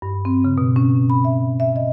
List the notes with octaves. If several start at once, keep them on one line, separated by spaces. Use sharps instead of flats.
G2
C4
C#3
B2
C#4
B5
E5
E5
D#5